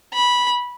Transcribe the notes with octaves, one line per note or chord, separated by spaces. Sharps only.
B5